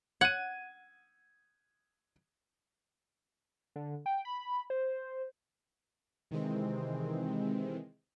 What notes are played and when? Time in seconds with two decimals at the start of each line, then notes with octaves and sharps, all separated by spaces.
0.21 F#5 G#6 D#7
3.76 D3
4.06 G5
4.25 B5
4.70 C5
6.31 C3 D#3 E3 G#3 C4